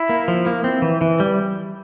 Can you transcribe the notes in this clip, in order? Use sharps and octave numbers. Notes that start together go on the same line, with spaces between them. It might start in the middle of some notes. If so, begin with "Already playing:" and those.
Already playing: E4
A#3
F3
A#3
C4
E3
E3
G3